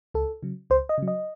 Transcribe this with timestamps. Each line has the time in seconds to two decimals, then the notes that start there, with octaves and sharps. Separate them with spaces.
0.14 C#2 A4
0.43 C#3 F#3
0.70 C#2 C5
0.89 D#5
0.98 C#3 F#3
1.08 D#5